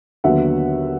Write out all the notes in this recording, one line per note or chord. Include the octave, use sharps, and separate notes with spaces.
D#2 D3 F#3 B3 E5 F#5